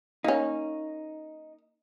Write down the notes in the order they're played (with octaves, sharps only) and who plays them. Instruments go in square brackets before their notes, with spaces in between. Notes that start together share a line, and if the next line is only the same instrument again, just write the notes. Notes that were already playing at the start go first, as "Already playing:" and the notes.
[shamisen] A#3 C#4 [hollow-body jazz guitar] D#4